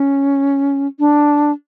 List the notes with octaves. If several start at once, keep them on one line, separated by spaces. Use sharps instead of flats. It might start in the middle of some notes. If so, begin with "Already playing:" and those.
Already playing: C#4
D4